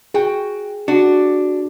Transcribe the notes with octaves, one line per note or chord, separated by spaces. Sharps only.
F#4 G#4 G5
D4 F#4